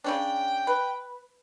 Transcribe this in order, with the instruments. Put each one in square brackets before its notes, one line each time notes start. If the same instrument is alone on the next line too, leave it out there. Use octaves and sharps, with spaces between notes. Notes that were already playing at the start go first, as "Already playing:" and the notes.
[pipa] C#3 C#4 D4 [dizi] G5
[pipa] B4